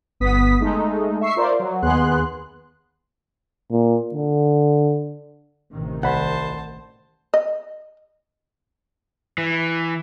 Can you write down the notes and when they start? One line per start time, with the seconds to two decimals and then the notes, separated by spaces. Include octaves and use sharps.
0.20 G1 B3 D#6 B6
0.60 G#3 A3 D#4
1.21 E5 C#6 C7
1.36 F4 A#4 C5 D5
1.60 F#3
1.82 D#2 B3 G#4 C6 F#6
3.71 A#2
4.14 D3
5.72 A1 C3 D#3
6.03 C2 C5 F#5 A5 B5
7.34 D#5
9.38 E3